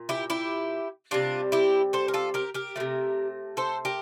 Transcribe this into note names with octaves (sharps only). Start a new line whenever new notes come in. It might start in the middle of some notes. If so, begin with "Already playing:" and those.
Already playing: A#2
E4 G4
E4 G4
C3 G3 D4 F4
E4 G4
A4 C5
A#4
F4 A4
G4 A#4
G4 A#4
C3 F3 A3
A4 C5
G4 A#4